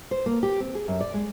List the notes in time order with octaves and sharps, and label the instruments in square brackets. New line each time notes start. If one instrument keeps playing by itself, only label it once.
[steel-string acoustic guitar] C5
A#3
G4
C4
G#4
F#2
D5
G#3